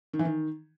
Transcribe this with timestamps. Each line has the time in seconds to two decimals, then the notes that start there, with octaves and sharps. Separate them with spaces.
0.13 D#3
0.19 E3
0.25 D#3